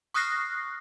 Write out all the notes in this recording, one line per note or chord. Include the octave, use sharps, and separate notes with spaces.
C#6 D#6 F6 F#6 A#6 C7